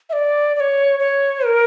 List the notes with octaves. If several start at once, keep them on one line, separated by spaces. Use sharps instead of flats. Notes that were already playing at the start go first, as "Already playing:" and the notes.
E5
D5
D5
C#5
C#5
A#4